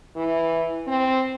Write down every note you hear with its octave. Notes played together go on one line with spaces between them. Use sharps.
E3
C4